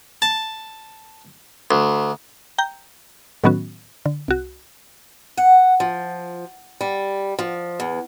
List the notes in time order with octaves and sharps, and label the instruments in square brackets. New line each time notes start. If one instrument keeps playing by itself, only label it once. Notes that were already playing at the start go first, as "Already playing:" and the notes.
[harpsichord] A5
D2
[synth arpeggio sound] G5 A#5 G6
A2 D#3 F#3 B3 C#4 F#4
D3
C2 F#4
[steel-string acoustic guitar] F#5
F3
G3
F3
E2